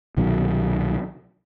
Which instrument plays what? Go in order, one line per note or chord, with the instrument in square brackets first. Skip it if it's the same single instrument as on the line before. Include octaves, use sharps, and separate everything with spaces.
[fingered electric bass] C2 B2 D#3 F#3